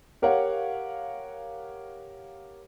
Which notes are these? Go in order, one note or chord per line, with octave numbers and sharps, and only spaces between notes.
G4 A#4 C#5 F5 F#5